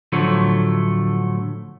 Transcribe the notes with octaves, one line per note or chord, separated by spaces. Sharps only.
A2 D3 F3 F#3 A3